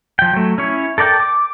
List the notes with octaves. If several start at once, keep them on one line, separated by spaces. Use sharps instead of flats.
F3 G5
F#3 A3
C#4 E4 C#5
A4 A#4 D5 G5 A5
D6